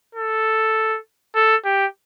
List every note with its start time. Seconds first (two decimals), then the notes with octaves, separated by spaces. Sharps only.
0.15 A4
1.35 A4
1.65 G4